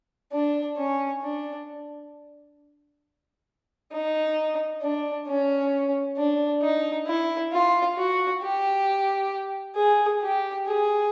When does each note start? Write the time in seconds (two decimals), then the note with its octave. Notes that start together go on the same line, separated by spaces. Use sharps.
0.32 D4
0.77 C#4
1.22 D4
3.92 D#4
4.81 D4
5.27 C#4
6.17 D4
6.62 D#4
7.06 E4
7.52 F4
7.97 F#4
8.42 G4
9.76 G#4
10.22 G4
10.67 G#4